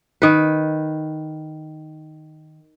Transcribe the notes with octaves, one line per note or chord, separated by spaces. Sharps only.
D#3 B4